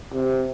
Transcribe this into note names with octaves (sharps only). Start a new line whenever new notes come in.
C3